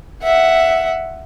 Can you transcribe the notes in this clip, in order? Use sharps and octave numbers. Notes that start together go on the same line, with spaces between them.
E5 F#5